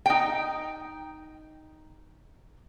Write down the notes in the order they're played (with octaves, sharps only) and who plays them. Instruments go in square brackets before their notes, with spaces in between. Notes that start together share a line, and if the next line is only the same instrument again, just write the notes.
[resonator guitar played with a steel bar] D#4 G5